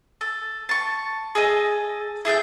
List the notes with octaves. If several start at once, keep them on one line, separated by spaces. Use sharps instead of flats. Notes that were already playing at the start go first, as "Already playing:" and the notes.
A4
A5 C#6
G#4 A4 D#5
E4 G#4 A4 G5